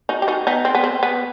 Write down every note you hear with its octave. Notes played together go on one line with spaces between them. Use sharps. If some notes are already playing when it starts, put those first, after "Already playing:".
D#4 F#4
G4
D#4 F#4
B3 D#4
C4
B3
C4
B3